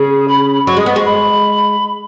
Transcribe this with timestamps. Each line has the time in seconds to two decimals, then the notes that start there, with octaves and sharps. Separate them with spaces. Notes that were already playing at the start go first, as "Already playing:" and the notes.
Already playing: C#3 G#4
0.28 B5
0.67 F#3 C#6
0.77 G#3 D#6
0.86 B3
0.92 G#3 C#6
1.05 B5